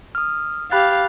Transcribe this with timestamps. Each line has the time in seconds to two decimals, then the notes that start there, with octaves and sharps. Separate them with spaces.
0.15 D#6 F6
0.71 G4 F5 B5 F#6 A6